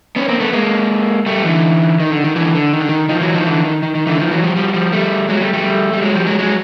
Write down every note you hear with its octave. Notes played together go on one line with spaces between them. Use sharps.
B3 C#4
A#3 C4
A3 B3
G#3 A#3
G3 A3
D3 E3
D#3
D3
D#3
D3 E3
D3
D#3
D3
D#3
D#3 F3
E3 F#3
D#3 F3
D3 E3
D#3
D#3
D#3
D3 E3
D#3 F3
E3 F#3
F3 G3
F3 G3
F3 G3
G3 A3
F#3 G#3
G3 A3
G3 A3
G3
F#3 G#3
F3 G3
F#3 G#3
F#3 G#3